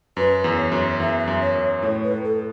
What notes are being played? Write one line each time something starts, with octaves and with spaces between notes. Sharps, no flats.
F#2 B4
E2
C#5
F#2
E2 E5
E5
F#2
C#5
F#2
A2 C#5
B4
A2
A4